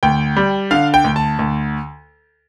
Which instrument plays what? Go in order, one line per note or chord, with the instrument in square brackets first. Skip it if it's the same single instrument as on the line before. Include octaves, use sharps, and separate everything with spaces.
[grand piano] D2 G5
G3
D3 F5
G5
D2
A5
D2